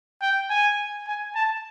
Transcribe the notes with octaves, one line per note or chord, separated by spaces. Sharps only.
G5
G#5
G#5
A5